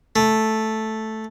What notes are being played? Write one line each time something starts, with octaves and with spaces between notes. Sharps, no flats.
A3